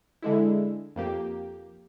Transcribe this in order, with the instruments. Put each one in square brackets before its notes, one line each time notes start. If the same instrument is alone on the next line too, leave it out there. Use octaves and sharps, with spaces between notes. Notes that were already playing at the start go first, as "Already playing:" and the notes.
[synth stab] D3 G#3 E4
F2 A#3 G4